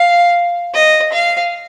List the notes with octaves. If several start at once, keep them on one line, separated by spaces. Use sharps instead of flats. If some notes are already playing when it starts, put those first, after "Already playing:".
Already playing: F5
D#5
F5